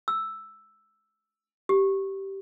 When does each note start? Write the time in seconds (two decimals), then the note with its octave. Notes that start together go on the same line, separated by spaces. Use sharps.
0.08 E6
1.69 G4